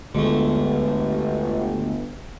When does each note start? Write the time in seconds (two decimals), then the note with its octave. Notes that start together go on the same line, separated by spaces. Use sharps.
0.15 G1 D2 D3 G#3 A3